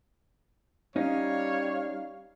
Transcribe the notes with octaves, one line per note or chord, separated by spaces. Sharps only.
G3 C#4 D#4 C#5 F5